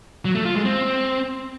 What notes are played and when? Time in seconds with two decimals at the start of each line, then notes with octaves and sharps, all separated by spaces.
0.25 F#3
0.35 A3
0.45 F4
0.55 G#3
0.65 C4